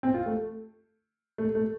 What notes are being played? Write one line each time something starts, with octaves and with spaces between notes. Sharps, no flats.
C4
F4
A3
A3
A3